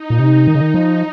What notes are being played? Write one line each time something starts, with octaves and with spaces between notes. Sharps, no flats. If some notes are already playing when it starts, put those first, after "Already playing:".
Already playing: D#4
A#2
C3
D#3
C#3
D#3
F3